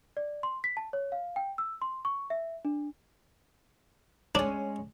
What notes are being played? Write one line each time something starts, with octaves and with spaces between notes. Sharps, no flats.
D5
C6
B6
A5
C#5
F5
G5
E6
C6
C#6
E5
D4
G#3 C#4 D4